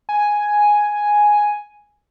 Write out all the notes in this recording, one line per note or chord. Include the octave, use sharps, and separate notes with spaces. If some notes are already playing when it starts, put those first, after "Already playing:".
G#5